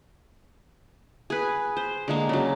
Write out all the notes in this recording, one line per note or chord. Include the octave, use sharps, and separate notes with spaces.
G#4 B4
C5
D3 G#3 A#3
C#3 F#3